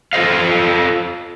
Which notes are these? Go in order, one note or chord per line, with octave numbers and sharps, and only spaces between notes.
F4 A4 C5 D#5 F5